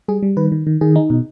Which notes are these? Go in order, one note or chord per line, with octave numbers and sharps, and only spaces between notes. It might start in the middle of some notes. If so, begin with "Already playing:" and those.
G3 G#4
G3
D#3 B4
D#3
D#3
D#3 G#4
D#4
B2